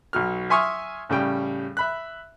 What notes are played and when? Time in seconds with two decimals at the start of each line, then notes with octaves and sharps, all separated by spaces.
0.13 B1 F#3 F6
0.50 E5 G#5 C6 C#6 D#6 F6
1.09 A2 C#3 G3 G5
1.77 E5 B5 F#6